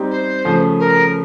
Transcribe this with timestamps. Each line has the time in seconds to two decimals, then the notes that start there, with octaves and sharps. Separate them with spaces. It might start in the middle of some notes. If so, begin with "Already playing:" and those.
Already playing: G3 C4 D#4 G4
0.11 C5
0.45 C#3 F3 A3
0.79 A#4